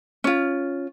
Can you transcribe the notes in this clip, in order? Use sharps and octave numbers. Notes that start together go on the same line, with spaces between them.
C#4 F4